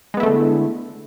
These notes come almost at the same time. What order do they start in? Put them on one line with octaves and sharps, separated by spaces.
G#3 B3 E4 A3 D3